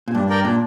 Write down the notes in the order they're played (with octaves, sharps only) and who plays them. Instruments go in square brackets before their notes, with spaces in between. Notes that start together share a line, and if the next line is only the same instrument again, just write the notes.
[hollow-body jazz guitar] A#2
[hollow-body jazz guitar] G2 [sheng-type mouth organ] D4
[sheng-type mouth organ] A#4 D5 G5
[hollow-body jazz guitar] A#2 [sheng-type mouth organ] D4